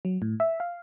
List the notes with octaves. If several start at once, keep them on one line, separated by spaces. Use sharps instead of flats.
F#3
A2
E5
F5